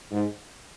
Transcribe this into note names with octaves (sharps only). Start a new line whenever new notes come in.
G#2